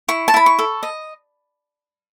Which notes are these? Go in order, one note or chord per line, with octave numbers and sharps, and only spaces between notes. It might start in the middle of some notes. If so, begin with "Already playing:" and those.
E4 C#6
A5
E4 B5
C#6
A4
D#5